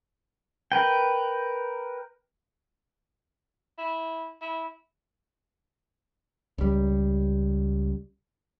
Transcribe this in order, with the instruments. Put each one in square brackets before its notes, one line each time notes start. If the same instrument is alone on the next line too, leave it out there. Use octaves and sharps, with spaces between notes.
[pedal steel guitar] A#4 B4 G5
[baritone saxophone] E4
E4
[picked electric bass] C#2 G3